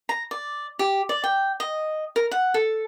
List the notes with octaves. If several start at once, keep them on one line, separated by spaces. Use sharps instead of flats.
A#5
D5
G4
D5
G5
D#5
A#4
F#5
A4